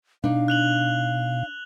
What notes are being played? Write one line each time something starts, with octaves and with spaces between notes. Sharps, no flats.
B2 D4 D#4 F5
F#6 F7 F#7